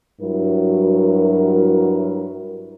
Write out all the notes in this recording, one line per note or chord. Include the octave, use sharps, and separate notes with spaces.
G2 F#3 E4 F#4 A#4